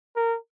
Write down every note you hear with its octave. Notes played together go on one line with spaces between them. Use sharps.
A#4